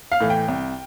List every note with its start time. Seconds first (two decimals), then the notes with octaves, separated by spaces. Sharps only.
0.12 F5
0.20 A2 E3 A3
0.30 G5
0.48 C2